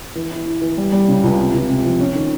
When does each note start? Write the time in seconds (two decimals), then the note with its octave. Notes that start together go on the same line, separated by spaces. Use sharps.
0.15 E3
0.31 E4
0.46 E4
0.61 E3
0.77 G3
0.92 G3
1.08 C#3
1.24 C#2
1.38 C3
1.54 C#2
1.69 C3
1.85 F3
2.00 C#4
2.15 D#3